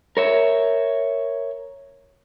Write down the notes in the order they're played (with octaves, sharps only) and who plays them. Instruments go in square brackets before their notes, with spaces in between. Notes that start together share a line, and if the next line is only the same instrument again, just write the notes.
[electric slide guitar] A#4 C#5 E5